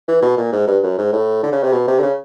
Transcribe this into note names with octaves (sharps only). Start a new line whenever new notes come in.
E3
B2
A#2
G#2
G2
F#2
G#2
A2
D3
C#3
C3
B2
C3
D3
C#3